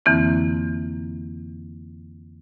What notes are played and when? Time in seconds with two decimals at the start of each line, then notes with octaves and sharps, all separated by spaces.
0.06 F2 D3 E3 A#3 C4 E4